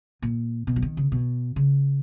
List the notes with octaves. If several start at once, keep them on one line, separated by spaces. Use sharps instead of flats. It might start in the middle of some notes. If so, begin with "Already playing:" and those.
A#2
B2
F3
D#3
C#3
B2
C#3